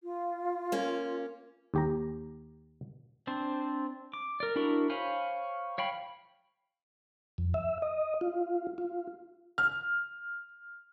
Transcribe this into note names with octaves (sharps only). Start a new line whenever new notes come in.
F4
A#3 C#4
D#2 G4 A#5
C4 D4 C5
D6
A#4 D5
D4 E4 F#4 A#4
C5 C#5 F5 G#5 B5
C#5 F5 G5 B5
F2
E5
D#5
F4
F4
F6